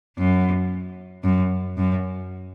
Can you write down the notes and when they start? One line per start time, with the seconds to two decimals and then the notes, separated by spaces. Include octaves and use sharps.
0.18 F#2
1.24 F#2
1.77 F#2